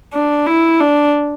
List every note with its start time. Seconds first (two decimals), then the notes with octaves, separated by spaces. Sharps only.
0.13 D4
0.47 E4
0.80 D4